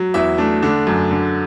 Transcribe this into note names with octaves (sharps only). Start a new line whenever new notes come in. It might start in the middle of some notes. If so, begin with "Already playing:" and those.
Already playing: F#3
E2 E4 E5
A3 D4
D3 D4
F#2
D3